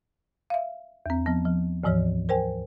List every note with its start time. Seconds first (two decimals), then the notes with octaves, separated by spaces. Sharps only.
0.50 E5 F5
1.06 E2 C4
1.26 F3 B3
1.45 F3
1.84 D2 G#2 E3 F3 C#5
2.29 A#4 C5 G5 G#5